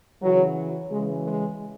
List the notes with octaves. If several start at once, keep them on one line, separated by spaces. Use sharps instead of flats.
C#3 E3 F#3
C#3 E3 G#3
G#3